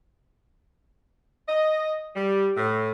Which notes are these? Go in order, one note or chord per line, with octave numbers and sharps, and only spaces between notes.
D#5
G3
A2